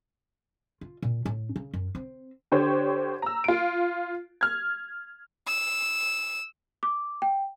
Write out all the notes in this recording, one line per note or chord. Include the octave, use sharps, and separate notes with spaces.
F4
A#2
A2
C#3
F#2
C4
D3 G4 C5 C#5
A#5 E6
F4 D7
F6 G#6
E6
D6
G5